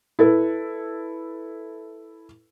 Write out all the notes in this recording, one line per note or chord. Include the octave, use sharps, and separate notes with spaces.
E4 A4 B4